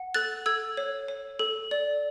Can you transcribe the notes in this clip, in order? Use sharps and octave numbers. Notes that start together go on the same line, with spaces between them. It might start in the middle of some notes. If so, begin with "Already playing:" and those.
Already playing: F#5
A4 F#6 A6
A4 E6 G#6
C#5
C#5
A4
D5